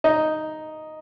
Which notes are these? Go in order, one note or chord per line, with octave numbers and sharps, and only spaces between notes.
D#4